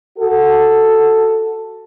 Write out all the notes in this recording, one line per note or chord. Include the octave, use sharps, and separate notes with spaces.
F#4 A4